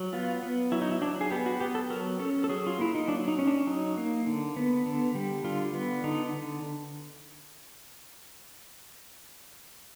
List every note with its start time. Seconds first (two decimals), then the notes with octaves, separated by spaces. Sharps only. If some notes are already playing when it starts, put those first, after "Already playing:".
Already playing: F#3
0.13 B3 F4
0.43 B3
0.72 F#3 E4
0.82 D#4
0.92 E4
1.01 F#3 D4
1.21 G#4
1.31 B3 G4
1.46 F#4
1.60 B3 G4
1.75 A4
1.90 F#3 A#4
2.19 C#4 A4
2.44 A4
2.49 F#3 G#4
2.67 F4
2.79 A#3 E4
2.95 D#4
3.08 F#3 D4
3.28 D#4
3.39 C#4
3.47 D4
3.67 F#3 D#4
3.97 A#3
4.27 D3
4.56 B3
4.86 D3
5.15 G3
5.44 D3 F4
5.74 B3
6.04 D3 D#4